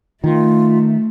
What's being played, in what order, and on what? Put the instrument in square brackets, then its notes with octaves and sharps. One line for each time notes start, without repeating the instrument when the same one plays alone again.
[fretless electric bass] D#3 [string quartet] A3 [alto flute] F4